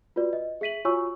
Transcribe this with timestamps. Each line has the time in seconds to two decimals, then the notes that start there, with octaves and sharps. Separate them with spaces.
0.16 F4 F#4 B4 D5
0.33 D#5
0.61 G#4 E5 B6 D#7 F#7
0.85 F4 F#4 C#5 G#5 C#6 E6